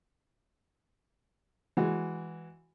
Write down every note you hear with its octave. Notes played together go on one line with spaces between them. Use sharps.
E3 G#3 F#4